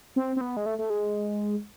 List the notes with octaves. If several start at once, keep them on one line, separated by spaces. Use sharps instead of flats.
C4
C4
B3
G#3
A3
A3
G#3